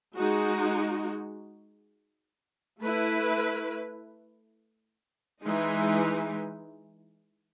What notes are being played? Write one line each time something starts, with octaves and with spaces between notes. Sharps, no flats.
G#3 D#4 F#4
A3 E4 B4
E3 G#3 D#4